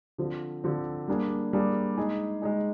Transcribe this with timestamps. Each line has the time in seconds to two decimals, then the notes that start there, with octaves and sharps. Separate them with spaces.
0.18 D3 F3 C4
0.64 D3 F3 C4
1.08 G3 A#3 D4 G#4
1.53 G3 A#3 D4 G#4
1.97 G#3 D#4 G#4
2.42 G#3 D#4 G#4